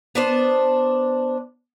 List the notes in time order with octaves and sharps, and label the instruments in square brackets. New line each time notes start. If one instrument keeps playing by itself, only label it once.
[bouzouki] B3 D4 C5